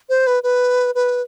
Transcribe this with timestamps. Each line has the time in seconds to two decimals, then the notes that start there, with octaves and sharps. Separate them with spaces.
0.09 C5
0.27 B4
0.43 B4
0.95 B4